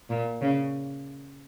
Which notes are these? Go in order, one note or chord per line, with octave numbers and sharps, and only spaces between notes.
A#2
C#3